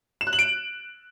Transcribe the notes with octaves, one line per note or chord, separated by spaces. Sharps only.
E7
F#6
F#7
D7